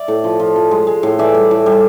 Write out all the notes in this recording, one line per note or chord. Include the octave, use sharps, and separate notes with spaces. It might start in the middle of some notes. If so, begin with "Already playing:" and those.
Already playing: D5 E5
A2
F3
F3
F3
G#3
G#3
A2
E3 D5 E5
G3
A2
G3